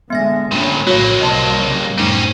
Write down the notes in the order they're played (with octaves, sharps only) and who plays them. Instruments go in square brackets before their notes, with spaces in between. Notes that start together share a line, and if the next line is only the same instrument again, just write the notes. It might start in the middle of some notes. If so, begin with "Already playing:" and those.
[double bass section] D3 G#3 [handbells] B3 E5 A#6
[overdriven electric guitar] G2 A#2 [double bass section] D3 C#4
[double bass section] A#1 A2 [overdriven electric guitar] F#3 A#3 [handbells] F#4 C#5 B5
[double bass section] C2 G3 [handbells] D#5 A5 C6
[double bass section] C#3 G3
[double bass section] F#2 A2 [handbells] A3 D#4 [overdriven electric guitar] C4 C#4